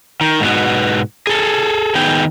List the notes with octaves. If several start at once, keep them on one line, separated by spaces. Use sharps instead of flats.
D#3
G#2 B2 B3
G#4 A4
D#3 B3 G#4 G5